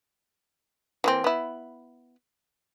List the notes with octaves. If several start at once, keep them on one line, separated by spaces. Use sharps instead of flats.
E3 A#3 C4
B3 E4